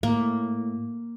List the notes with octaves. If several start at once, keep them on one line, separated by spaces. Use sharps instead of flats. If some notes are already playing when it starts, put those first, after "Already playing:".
A2 A#3